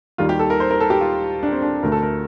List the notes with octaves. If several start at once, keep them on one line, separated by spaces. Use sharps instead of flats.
D#2 D#3 G3 F4
G4
A4
A#4
C5
A#4
A4
G4
F4
D4
C4
D4
D2 D3 A3 A#4
A4
A#4